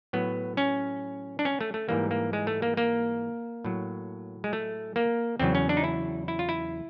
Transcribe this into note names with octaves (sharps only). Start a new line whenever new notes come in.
A2 F#3 B3
C#4
D4
C#4
A3
A3
G#2 E3 G3 A#3
A#3
G#3
A3
A#3
A#3
A2 F#3
G#3
A3
A#3
E2 C#3 F#3 C4
C#4
D4
D#4
E4
E4
F4
E4